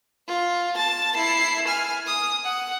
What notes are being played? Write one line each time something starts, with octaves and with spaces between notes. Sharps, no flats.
F4
A5 A6
E4 C7
G#5 F6
D#6
F#5